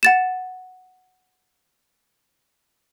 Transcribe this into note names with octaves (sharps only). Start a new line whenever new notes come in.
F#5 A6 E7